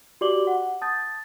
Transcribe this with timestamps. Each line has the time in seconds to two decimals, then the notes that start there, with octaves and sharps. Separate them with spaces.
0.21 F#4 G4 D5 D6 F#7 G7
0.47 F#5
0.81 A5 D#6 G6 A6